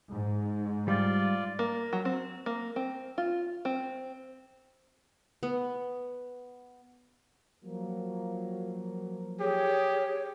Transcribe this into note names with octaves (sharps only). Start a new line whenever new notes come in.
G#2
G3 F4 D5
A#3
F#3
C4
A#3
C4
F4
C4
B3
F3 F#3 A#3
G4 G#4 C#5